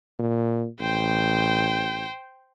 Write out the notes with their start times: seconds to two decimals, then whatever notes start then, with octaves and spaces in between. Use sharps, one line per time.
0.19 A#2
0.80 A1 C5 G5